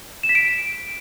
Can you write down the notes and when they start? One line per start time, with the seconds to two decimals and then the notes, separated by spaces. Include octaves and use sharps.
0.23 E7
0.29 B6
0.35 D7